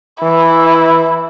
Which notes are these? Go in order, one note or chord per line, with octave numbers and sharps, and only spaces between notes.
E3 E4